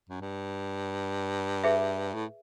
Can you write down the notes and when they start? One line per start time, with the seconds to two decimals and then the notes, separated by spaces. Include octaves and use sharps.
0.10 F#2
0.21 G2
1.64 G#4 B4 E5
2.15 A2